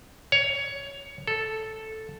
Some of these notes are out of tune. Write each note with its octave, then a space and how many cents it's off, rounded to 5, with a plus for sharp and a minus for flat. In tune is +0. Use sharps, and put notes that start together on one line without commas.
C#5 +15
A4 -5